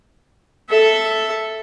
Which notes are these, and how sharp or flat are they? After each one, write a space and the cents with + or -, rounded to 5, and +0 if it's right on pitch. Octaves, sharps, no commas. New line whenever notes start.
A4 +0 E5 +0